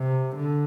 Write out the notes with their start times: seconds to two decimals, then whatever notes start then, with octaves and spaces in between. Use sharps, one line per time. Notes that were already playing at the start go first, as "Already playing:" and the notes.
Already playing: C3
0.35 D3